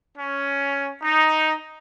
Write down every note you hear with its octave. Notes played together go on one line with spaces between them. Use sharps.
C#4
D#4